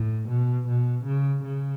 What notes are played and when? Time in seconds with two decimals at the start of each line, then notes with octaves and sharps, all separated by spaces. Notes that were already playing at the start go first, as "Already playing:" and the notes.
Already playing: A2
0.29 B2
0.67 B2
1.05 C#3
1.44 C#3